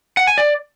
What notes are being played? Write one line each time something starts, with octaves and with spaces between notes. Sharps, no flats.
F#5
G#5
D5